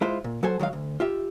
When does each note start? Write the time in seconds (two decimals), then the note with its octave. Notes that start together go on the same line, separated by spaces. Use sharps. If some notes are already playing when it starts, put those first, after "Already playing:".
0.01 G#3 E4 F4 C5
0.24 A#2
0.43 F#3 F#4 A4 C5 G#5
0.59 D#3 F#3 G#3 F5
0.73 D2
1.00 F4 G4 E5